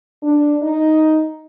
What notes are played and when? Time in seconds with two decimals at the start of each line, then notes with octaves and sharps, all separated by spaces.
0.22 D4
0.62 D#4